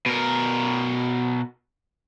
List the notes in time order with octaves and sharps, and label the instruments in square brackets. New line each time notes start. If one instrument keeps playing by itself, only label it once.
[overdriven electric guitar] B2 A#4